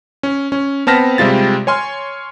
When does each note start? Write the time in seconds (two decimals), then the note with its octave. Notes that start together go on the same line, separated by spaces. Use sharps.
0.23 C#4
0.52 C#4
0.87 B3 C4 A5 F6 A#6 B6
1.18 C3 G3 G#3 F4 A6
1.67 C#5 G#5 C6 F6